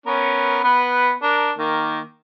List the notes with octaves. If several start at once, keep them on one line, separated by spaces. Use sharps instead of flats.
B3 C#4 A#4
B3 B4
D4 A#4
D#3 A#3